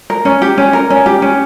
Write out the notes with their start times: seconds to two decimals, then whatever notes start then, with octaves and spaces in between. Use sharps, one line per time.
0.10 A#4
0.25 C#4
0.42 G4
0.58 C#4
0.73 A#4
0.90 C#4
1.06 G4
1.22 C#4